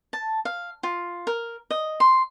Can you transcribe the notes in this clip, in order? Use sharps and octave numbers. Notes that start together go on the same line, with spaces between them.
A5
F5
F4
A#4
D#5
C6